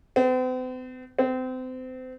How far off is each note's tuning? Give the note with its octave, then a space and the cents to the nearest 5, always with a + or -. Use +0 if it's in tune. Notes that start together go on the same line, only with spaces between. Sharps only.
C4 -45
C4 -30